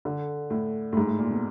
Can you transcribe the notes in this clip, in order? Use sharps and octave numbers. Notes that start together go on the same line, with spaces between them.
D3
A2
A2
G#2
A2
A#2
B2